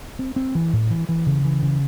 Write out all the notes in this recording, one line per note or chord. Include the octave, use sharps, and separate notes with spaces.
C4
C4
E3
A2
E3
E3
C#3
E3
C#3